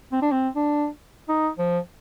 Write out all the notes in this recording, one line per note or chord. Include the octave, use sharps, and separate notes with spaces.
C4
D4
C4
D4
D#4
F3